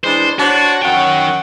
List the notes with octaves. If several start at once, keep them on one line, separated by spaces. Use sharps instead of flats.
E3 G#3 D4 C5
D4 F#4 C5 C#5
F#2 D#3 C#5 F#5 G5